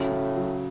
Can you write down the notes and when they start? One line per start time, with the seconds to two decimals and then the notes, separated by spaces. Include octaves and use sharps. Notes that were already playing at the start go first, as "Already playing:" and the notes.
Already playing: A2 C#3 F#3
0.12 C#3
0.36 F#3